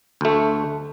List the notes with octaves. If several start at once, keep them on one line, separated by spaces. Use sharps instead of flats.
D2 A3